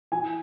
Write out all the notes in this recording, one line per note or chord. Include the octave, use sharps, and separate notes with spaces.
E3 G#5